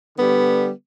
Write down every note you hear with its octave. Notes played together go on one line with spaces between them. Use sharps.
D3 G3 B3